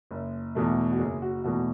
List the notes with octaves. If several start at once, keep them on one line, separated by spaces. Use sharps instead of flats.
F#1
E2 B2 A3
F#4
F#1 G#4
F#4
E2 B2 A3 F#4